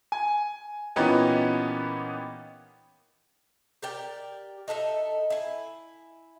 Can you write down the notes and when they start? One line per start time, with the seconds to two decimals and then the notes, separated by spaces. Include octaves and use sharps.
0.12 G#5
0.96 A#2 E3 B3 C#4 D#4 G4
3.83 G4 A#4 D5 G5
4.68 D#4 A4 A#4 E5
5.30 E4 G#5